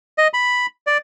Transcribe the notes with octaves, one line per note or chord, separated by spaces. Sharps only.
D#5
B5
D5